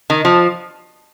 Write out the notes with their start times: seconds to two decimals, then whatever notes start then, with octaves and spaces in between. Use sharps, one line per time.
0.10 D#3
0.25 F3